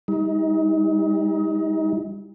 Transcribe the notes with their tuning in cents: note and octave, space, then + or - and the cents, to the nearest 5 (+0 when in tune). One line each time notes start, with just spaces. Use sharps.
G3 +30 D#4 +30